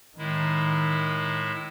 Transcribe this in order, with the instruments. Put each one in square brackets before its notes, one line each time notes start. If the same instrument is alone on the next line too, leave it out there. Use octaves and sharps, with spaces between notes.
[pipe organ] A2 G#3 E4 [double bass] D#3